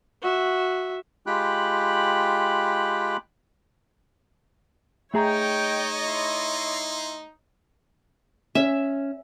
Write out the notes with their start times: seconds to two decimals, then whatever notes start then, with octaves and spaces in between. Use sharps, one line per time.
0.22 F#4 E5
1.26 G#3 F4 G4 G5 B5 F#6
5.14 A3 D#4 G#4 C#5 D#5 G5 A#5
6.05 E4 C6
8.55 C#4 E5